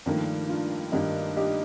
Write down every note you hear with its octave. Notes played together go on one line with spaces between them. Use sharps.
G2 D#3 F3 A3 A#3
D4 F4
G2 D#3 A#3 D#4 G4
D#4 G4